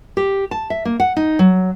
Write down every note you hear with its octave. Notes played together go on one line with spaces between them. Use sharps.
G4
A5
E5
A#3
F#5
D#4
F#3